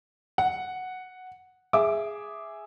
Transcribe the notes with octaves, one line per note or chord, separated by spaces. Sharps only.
F#5
G#4 E5 D6